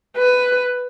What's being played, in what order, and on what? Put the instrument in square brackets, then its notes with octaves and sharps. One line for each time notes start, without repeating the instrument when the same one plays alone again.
[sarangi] B4